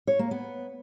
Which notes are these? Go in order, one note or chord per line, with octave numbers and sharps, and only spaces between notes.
C#5
A#3
B3